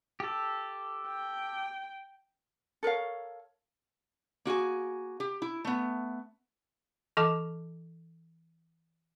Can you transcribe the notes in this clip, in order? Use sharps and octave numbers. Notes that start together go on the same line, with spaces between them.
G4 A4
G5
A4 A#4 C#5 F5
A#3 F#4 G#4 G#5
G4
E4
A3 B3
E3 A4 D#5 A5 D6